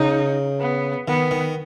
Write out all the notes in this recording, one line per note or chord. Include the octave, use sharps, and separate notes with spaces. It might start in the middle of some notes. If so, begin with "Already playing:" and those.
Already playing: C#3 D#4
B3
D#3 B3
D#3